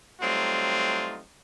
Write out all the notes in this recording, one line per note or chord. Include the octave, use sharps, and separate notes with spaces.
F#3 G3 A3 C4 D#4 F4